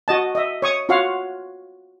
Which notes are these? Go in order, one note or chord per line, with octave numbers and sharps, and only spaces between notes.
F#4 D#5 A5
D#5 E5
C#5 C#6 D#6
F4 F#4 C#5 F5 F#5